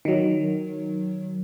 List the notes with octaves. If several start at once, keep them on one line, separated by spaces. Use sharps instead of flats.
D#3 F#3